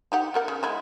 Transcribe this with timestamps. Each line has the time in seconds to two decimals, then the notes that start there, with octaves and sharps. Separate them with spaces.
0.12 D#4 G4 F#5
0.34 B3 A#4 F#5
0.48 C#3
0.63 G#3 E4